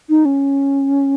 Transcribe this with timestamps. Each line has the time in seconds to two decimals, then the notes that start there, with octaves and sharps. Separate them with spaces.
0.09 D#4
0.25 C#4